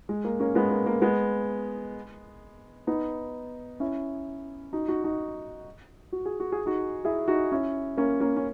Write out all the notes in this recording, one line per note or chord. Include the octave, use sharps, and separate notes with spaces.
G#3
A#3
A#3 C#4
G#3 B3
A#3
A#3
G#3 B3
B3 D#4
C#4 E4
D#4 F#4
D#4 F#4
D#4 F#4
F#4
G#4
F#4
G#4
D#4 F#4
E4 G#4
D#4 F#4
C#4 E4
A#3 C#4
A#3 C#4
C#4